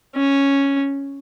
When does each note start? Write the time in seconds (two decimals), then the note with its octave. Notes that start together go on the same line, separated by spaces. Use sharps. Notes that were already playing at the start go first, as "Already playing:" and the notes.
0.16 C#4